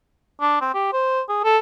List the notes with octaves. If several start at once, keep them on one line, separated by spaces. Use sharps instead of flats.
D4
C4
G4
C5
G#4
A4